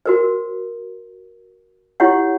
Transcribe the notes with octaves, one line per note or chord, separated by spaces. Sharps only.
F#4 A#4 C5
E4 G4 C#5 F#5